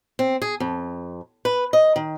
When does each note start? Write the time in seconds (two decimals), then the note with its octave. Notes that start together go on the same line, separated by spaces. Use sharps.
0.19 C4
0.42 G#4
0.60 F2
1.45 B4
1.73 D#5
1.96 D#3